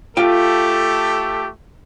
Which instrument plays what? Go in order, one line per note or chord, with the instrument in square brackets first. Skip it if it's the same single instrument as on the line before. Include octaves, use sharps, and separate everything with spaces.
[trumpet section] A3 G4 A4 [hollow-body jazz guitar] F4 G5